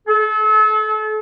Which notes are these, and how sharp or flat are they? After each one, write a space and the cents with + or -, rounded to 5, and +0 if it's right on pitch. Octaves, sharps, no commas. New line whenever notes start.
A4 -35